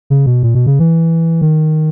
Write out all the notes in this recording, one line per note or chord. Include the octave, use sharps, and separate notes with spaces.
C#3
B2
A#2
B2
C#3
E3
D#3